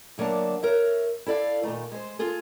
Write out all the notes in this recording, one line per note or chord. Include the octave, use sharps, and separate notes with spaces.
D2 F#3 A#3 D4 A5
A#4 C#5 E5
E4 A4 D5 F5
A#2 D#3 A3
G#3 C5
F4 G#4 A4